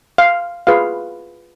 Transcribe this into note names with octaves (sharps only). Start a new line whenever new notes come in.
F5
F4 G#4 B4 F5